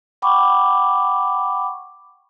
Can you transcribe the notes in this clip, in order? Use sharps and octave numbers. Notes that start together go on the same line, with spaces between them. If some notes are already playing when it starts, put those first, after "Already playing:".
F#5 G5 B5 C#6 D6